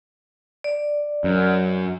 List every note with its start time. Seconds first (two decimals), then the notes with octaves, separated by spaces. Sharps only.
0.64 D5
1.24 F#2